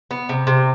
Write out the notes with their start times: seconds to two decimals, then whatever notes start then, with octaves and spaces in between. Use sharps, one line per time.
0.11 B3
0.29 C3
0.47 C3